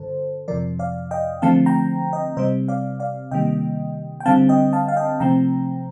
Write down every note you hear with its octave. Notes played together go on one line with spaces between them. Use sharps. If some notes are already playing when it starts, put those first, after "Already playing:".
Already playing: G2 D3 A4 C5
F2 C3 F3 A#4 D5
D5 F5
D#5 G5
D3 F3 A3 C4 F5 A5
G5 A#5
D#5 G5
C3 G3 C4 C5 D#5
D5 F5
D5 F5
C3 D#3 G3 A#3 D#5 G5
G5
D3 G3 C4 F5 A5
D#5 G5
F5 A5
F5
D#5 G5
C3 F3 A3 C4 G5 A#5